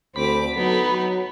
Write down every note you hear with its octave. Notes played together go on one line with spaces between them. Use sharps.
D2 C4 B5 D6
F#3 B3 D#4 A4
F#3